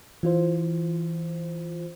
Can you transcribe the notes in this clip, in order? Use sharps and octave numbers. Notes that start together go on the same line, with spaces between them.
E3 F4 C5